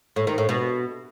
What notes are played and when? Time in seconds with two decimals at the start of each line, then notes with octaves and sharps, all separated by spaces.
0.16 A2
0.27 D#3
0.38 A2
0.49 B2